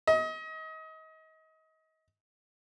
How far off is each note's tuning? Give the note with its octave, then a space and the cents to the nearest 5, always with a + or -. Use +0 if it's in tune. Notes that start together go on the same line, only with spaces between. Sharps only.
D#5 +30